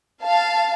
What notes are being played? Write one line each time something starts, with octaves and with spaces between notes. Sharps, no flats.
F5 A5